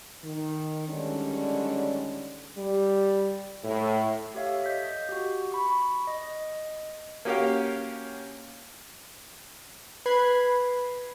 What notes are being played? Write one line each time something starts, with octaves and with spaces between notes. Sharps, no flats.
D#3
D3 D#3 G3 G#3 C#4
G3
A2
G4 A4 C#5 E5 F5
D#5 G6 B6
F#4 G4
B5 C#6
D#5
A#3 C#4 F#4 G4 A#4 F5
B4 B5 G#6 C7